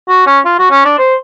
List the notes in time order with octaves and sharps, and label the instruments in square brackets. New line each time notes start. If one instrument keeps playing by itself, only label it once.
[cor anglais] F#4
C#4
F4
F#4
C#4
D4
C5